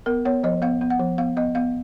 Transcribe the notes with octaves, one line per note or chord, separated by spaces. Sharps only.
B3 A#4
B3 C#5
F3 D#5
B3 F5
B3
F#5
F3
B3 F5
B3 D#5
B3 F5